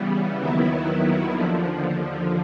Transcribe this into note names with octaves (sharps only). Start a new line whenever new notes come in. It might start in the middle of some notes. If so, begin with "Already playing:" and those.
Already playing: C#3 E3 G3 B3
D#2 D#3 F#3 B3 E4
D#2 D3 F3